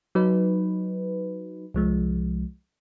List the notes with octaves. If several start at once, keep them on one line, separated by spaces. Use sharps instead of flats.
F#3 D#4 B4
C2 F3 G#3